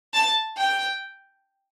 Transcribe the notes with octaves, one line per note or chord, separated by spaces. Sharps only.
A5
G5